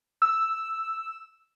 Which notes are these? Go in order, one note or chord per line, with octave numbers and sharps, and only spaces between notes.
E6